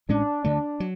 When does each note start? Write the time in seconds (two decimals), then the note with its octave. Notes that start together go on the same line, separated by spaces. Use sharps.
0.09 A1 A2 G#3 C#4 D4
0.44 D2 D3 A3 D4
0.80 F#3